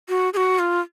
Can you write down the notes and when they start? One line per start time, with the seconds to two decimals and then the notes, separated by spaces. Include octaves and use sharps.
0.09 F#4
0.34 G#4
0.37 F#4
0.59 F4